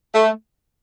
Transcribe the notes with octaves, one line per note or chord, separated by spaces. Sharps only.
A3